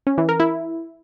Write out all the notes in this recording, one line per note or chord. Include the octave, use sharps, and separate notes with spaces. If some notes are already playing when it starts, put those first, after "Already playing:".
C#4
E3
A#4
E4